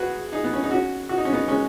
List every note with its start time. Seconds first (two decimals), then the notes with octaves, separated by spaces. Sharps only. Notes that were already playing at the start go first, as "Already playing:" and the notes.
Already playing: F#4 G#4 B4
0.32 D#4 G#4
0.44 B3
0.53 C#4
0.63 D#4
0.71 C#4 F#4
1.09 F#4
1.18 D#4
1.25 C#4
1.33 B3 D#4
1.48 G#3 C#4